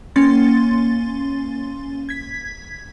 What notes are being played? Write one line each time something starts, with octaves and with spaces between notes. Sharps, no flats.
A#3 C#4 C6 A6
G#6 B6